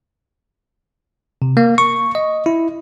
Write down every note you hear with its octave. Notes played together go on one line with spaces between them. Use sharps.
C3
A#3
C#6
D#5
E4